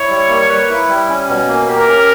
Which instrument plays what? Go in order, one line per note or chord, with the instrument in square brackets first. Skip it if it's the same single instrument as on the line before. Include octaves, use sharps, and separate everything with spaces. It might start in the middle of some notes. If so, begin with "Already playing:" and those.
Already playing: [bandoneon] E4 [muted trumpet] C#5
[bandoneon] G3
A#3
B4
E4
G3
C#4
B2
A#3
[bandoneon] G4 [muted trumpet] A#4
[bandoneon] C#4